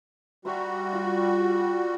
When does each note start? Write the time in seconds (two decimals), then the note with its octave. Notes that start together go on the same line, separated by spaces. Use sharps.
0.45 G3 F#4 C5 E5 A#5
0.93 F4